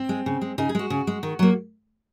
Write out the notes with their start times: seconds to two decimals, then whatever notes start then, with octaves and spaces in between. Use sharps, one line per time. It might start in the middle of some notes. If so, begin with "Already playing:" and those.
Already playing: C4
0.09 G#3
0.26 C#3
0.41 G#3
0.58 C#3 D#4
0.69 G#4
0.75 G#3 F#4
0.90 C#3
1.07 G#3
1.23 D#3
1.39 F#3 A#3